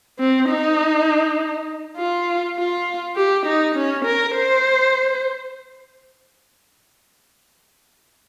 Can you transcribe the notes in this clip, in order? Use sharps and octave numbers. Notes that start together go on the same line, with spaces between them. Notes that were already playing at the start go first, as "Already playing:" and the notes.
C4
D#4
F4
F4
G4
D#4
C#4
A#4
C5